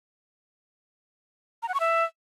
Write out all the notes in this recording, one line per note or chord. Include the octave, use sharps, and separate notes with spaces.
A#5
F#5
C#6
E5